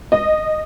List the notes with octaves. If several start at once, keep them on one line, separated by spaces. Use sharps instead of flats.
D#5